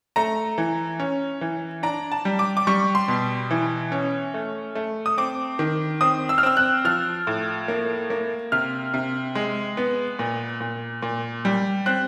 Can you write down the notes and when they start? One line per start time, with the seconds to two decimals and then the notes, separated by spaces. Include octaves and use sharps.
0.16 A3 A#5
0.58 E3
1.00 C#4
1.41 E3
1.83 D4 A#5
2.12 A5
2.25 G3
2.39 D6
2.57 D6
2.67 G3 C#6
2.95 C6
3.08 B2
3.51 E3
3.92 C#4
4.34 A3
4.75 A3
5.06 D#6
5.18 C4 D6
5.59 D#3
6.01 C4 D#6
6.29 E6
6.38 F6
6.43 C4 E6
6.57 F#6
6.85 F3 F6
7.27 A2
7.68 A#3
8.10 A#3
8.52 C3 F6
8.94 C3
9.35 G#3
9.77 B3
10.19 A#2
10.61 A#2
11.02 A#2
11.45 G3
11.86 C4 F#6